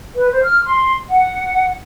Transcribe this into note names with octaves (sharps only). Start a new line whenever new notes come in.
B4
C5
F6
C6
F#5